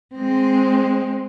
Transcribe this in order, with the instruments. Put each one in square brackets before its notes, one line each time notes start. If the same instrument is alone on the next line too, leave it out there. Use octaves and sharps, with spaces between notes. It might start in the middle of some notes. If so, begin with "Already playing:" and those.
[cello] G#3 C4